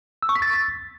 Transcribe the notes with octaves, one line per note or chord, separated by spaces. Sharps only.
E6
C#6
B6
A6